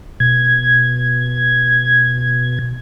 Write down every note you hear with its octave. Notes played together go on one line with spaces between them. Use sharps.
B2 G#6